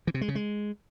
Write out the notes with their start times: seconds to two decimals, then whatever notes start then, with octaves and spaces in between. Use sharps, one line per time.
0.07 E3
0.14 C3
0.21 G#3
0.28 C#3
0.35 G#3